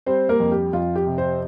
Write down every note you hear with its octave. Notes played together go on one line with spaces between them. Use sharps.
G3 C4 C5
A#3 A#4
F2
G4
F2 F4
G4
C3
C4 C5